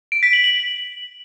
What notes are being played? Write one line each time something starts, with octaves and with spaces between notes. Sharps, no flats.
D7
B6
F#7
F#7